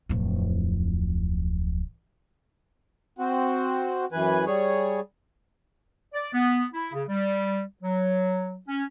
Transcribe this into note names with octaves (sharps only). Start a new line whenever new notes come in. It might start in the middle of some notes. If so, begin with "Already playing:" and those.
D1 F2
C4 F#4
F#2 E3 B4 G#5
G3 G#4 C#5
D5
B3
E4
C#3
G3
F#3
C#4